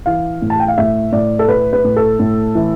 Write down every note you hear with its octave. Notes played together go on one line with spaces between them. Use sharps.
E3 F5
A2
A5
G5
F5
A2 E5
A2 D5
A4
A2 B4
B4
A2
A4
A2
E3